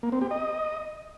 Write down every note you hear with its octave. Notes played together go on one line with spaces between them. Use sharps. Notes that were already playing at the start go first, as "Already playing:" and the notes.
A#3
C4
G4
D#5